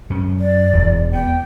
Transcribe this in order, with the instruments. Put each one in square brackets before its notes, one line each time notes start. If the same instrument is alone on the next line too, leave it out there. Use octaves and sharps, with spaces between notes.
[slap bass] F#2 C#4
[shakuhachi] D5
[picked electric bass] E1 [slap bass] E2
[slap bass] B3 [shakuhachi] G5